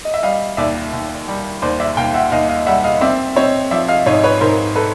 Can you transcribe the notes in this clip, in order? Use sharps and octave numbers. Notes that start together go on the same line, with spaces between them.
D#5
E5
G3 D#5 F5
D#2 D5 E5
D#2
G3
D#2 C5 D5
D5 E5
D#2 F5 G5
E5 F#5
D#2 D#5 F5
D#5 F5
G3 E5 F#5
D#5 F5
C4 D5 E5
C4 C#5 D#5
F3 D5 E5
D#5 F5
G#2 C#5 D#5
B4 C#5
G#2 A#4 C5
A4 B4